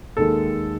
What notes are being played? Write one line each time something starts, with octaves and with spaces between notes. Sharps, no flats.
D#2 D#3 G#3 A4